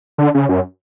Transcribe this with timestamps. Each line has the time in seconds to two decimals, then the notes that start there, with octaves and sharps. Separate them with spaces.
0.18 D3
0.34 C#3
0.49 F#2